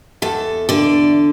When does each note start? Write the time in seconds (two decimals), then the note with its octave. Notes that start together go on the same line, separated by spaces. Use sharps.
0.22 E2 A4
0.69 D3 D5